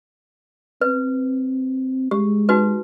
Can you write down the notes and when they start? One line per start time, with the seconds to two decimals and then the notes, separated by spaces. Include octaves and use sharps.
0.81 C4 B4
2.11 G#3 G4
2.49 D#4 F#4 B4